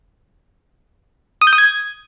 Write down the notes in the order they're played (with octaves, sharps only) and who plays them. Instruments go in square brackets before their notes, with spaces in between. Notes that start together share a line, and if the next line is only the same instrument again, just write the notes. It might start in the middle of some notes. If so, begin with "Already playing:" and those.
[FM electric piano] D#6
G6
D#6
G#6